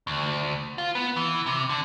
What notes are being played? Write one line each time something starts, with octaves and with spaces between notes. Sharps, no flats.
D2
F4
B3
E3
C3
D3